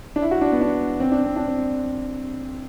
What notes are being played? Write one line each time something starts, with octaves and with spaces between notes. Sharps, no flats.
D4
E4
F#4
D4
B3
D4
C4
D4
C4
D4
C4